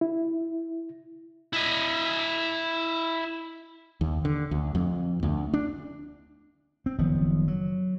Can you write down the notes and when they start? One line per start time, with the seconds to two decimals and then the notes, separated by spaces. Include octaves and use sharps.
0.01 E4
1.53 E4 D#5
4.01 D#2
4.25 D3
4.51 D2
4.75 F2
5.23 D2
5.54 D4
6.86 C4
6.99 F#1 D#3 F3 B3
7.48 F#3